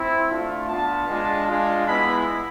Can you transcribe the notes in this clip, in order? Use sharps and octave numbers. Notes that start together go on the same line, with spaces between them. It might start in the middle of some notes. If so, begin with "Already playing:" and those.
Already playing: C4 E4
A3 D4 F4
B3 D4 F4 A5
G#3 D4 F4
G#3 D4 F4
G#3 B3 E4 B5